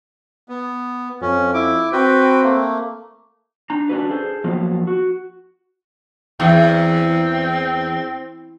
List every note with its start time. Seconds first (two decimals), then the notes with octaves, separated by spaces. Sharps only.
0.49 B3
1.21 F2 C#4
1.54 E4 D6
1.92 C4 F#4 B4 G5
2.43 A3 A#3
3.70 D4 A#5
3.89 C#4 D4 F#4 B4
4.10 G#4 A4 C5
4.44 F3 F#3 A#3 B3 F4
4.87 F#4
6.40 E2 C4